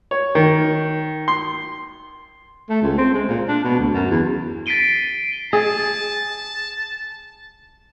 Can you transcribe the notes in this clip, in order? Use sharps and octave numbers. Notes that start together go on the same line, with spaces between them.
C#5
D#3
C6
A3
C#2
C4
G#3
A#2
D4
B2
D2
F#2
E2
A6 B6 C7 D7 D#7 G7
G#4 A5